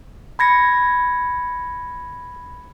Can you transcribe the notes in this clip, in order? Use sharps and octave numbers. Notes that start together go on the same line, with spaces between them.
B5 G#6 A#6 C#7